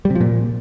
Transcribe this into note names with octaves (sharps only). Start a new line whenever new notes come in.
G3
C3
F3
A#2